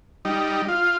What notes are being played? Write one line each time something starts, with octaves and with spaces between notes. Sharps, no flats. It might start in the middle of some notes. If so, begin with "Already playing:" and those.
G3 D#4
F4